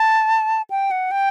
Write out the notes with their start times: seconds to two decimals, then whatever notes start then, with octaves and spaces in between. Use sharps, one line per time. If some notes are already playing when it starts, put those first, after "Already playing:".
Already playing: A5
0.70 G5
0.91 F#5
1.11 G5